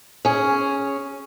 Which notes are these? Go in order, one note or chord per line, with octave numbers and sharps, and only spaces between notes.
C#4 G#4